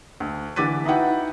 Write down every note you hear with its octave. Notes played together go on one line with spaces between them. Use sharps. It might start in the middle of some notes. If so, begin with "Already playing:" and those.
D2
D3 E3 D6 A6 B6 D#7
D#4 E4 F#4 B4 F#5 G5